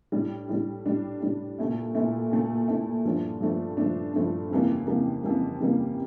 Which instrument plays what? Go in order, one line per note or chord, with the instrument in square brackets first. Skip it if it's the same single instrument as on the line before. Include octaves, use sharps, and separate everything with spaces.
[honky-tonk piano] A2 G3 D4
A2 G3 D4
A2 G3 D4
A2 G3 D4
A#2 A3 E4
A#2 A3 E4
A#2 A3 E4
A#2 A3 E4
G2 F3 A3 D4
G2 F3 A3 D4
G2 F3 A3 D4
G2 F3 A3 D4
F2 C#3 E3 G3 A#3
F2 C#3 E3 G3 A#3
F2 C#3 E3 G3 A#3
F2 C#3 E3 G3 A#3